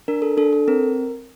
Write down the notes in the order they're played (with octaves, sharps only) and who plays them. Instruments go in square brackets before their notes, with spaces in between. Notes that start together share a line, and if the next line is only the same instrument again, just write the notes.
[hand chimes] D4 A#4
A4
D4 A4
A4
C4 A#4